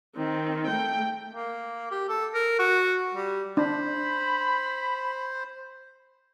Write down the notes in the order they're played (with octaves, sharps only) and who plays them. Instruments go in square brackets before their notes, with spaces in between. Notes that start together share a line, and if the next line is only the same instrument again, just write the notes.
[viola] D#3 C4
A3 G5
[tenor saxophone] A#3
G4
A4
A#4
F#4
G3
[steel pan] D4 [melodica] C5 [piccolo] B5